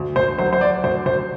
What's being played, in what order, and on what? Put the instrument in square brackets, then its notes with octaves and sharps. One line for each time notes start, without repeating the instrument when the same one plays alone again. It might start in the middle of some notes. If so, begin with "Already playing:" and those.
Already playing: [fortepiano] D2
[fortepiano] D2 [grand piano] C5
[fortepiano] F#3 [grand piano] C5
[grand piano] C5
[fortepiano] F#3 [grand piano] D5
[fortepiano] D2 [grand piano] C5
[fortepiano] D2 [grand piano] C5